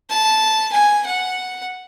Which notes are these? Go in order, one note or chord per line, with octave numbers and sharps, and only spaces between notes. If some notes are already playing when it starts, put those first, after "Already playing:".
A5
G#5
F#5